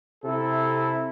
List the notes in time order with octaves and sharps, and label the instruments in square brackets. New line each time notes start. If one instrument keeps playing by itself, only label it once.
[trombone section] C3 E4 A4